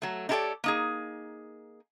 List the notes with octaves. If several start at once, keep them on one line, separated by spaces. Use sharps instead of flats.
F#3 A3
D#4 E4 G4 A4 C#5 D5
A#3 D#4 G#4